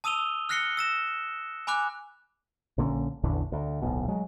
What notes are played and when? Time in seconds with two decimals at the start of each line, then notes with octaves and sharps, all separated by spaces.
0.04 A5 D#6 E6 D#7 F7 G7
0.49 F6 F#6 A#6 C7 C#7 G7
0.77 E6 A#6 E7
1.67 G#5 B5 D6 F#6
2.78 A#1 D3 A#3 C#4
3.24 A1 E2 D3
3.52 D2
3.82 D1 B1 B2
4.08 F#3 G#3